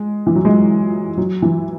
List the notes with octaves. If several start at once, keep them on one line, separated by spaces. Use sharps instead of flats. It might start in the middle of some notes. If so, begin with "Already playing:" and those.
Already playing: G#3
E3
F#3
G#3
F#3
E3